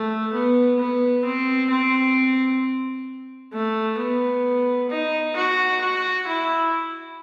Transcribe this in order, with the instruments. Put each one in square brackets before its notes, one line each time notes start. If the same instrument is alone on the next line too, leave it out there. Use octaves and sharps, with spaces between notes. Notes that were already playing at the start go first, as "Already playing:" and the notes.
Already playing: [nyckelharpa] A3
B3
B3
C4
C4
A3
B3
D#4
F#4
F#4
E4